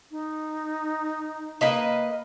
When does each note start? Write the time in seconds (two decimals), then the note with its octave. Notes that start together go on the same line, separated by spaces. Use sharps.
0.11 D#4
1.61 A#3 B4 D#5